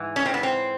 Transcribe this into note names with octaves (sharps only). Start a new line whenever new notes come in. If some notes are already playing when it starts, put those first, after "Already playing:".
Already playing: G#2 E3
C#4
C4
B3
C4